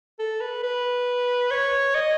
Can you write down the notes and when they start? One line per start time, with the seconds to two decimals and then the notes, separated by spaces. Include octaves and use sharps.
0.19 A4
0.41 B4
0.63 B4
1.51 C#5
1.95 D#5